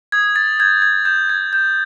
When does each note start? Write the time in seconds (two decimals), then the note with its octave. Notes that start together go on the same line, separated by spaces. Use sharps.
0.12 D#6 G#6
0.36 A6
0.60 G6 G#6
0.82 G#6
1.05 D#6 G6
1.29 G#6
1.53 G6